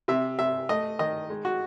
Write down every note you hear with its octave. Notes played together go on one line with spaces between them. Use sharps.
C3 E5
C3 E5
A3 D#5
D#3 D#5
G#3
F#4